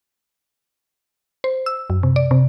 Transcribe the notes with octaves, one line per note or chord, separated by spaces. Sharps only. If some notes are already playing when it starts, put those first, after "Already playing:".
C5
E6
F#2
C3
D5
C3